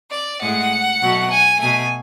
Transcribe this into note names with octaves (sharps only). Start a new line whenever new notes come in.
D5
A2 G#3 F#5
B2 F#3 A3
G#5
B2 A3 G#5